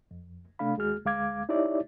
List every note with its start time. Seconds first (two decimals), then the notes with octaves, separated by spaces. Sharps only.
0.11 F2
0.59 C3 A3 D4 F5 B5
0.77 D#2 G#3 F#4 G#4 F6
1.05 D2 G#3 F5 D6 G#6
1.49 D#4 E4 G4 C#5 D5 E5